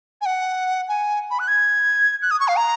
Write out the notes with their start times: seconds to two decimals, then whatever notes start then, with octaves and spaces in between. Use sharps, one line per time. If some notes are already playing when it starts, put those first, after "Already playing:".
0.21 G#5
0.26 F#5
0.89 G#5
1.31 B5
1.39 F#6
1.48 G#6
2.22 F#6
2.31 D#6
2.40 C#6
2.48 F5
2.56 A#5